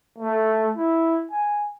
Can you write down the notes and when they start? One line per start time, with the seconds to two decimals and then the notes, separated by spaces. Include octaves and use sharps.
0.19 A3
0.77 E4
1.31 G#5